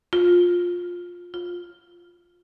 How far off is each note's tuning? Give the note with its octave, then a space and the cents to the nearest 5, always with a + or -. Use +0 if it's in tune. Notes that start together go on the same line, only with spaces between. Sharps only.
F4 +15
F4 +5